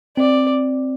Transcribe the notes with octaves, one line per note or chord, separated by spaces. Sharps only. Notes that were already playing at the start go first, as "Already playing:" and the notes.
C4 D5